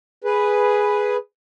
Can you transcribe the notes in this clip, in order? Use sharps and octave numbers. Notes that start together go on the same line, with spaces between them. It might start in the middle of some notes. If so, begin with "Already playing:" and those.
G#4 B4